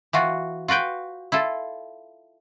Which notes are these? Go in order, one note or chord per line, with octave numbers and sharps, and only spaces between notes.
E3 F4 F#4
F4 F#4 B4 G5
E4 F4 A4